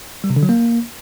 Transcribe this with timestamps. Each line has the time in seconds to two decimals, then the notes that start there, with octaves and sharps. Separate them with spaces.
0.24 G3
0.30 C3
0.36 D3
0.43 F#3
0.49 A#3